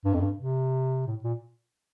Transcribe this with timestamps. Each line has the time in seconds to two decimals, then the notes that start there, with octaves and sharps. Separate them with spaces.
0.05 G2
0.14 F2
0.21 G2
0.38 C3
1.06 A2
1.24 A#2